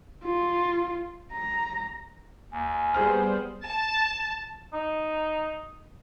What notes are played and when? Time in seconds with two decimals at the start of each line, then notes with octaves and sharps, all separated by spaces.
0.24 F4
1.32 A#5
2.52 D#2 G#5
2.94 G3 B3 G#4 C5 F6
3.65 A5
4.73 D#4